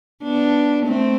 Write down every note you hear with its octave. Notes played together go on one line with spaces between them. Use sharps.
B3 D4
A3 C4